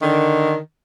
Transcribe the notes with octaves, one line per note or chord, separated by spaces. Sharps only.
D3 D#3